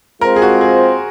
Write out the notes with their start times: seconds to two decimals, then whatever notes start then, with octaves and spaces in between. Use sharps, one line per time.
0.21 G#3 C4 F4 A#4 C5
0.36 G#4
0.42 F#4
0.61 G#4